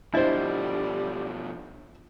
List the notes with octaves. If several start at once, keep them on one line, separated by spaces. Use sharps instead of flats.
B2 F3 G3 D4 E4 C5 D#5